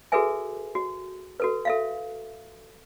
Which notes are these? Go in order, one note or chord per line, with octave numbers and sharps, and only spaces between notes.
F#4 G#4 A4 B4 E5 G#5
F#4
F#4 A4 B4
A4 E5 F5